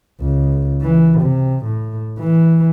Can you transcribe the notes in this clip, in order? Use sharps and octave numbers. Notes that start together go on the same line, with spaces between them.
C#2
E3
C3
A2
E3